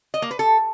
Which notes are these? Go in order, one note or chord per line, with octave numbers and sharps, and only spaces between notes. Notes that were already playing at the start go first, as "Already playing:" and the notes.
D#5
A#3
B4
A4